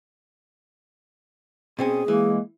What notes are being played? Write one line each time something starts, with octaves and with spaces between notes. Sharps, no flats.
B2 C4 C#4 G#4
E3 G#3 A#3